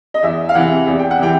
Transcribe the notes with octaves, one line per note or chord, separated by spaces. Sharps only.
D#5
E2 E5
F5
C3 E3 F#5
E2
G5
F#5
C3 E3 G5